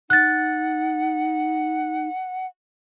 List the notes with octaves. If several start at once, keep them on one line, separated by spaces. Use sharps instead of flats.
D#4 F#5 F#6 A6